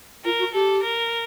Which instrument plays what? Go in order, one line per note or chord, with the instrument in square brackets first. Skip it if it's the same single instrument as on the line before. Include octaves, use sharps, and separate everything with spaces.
[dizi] F4 [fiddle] A#4
[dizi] F#4
[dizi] G4 [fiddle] A4
[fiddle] A#4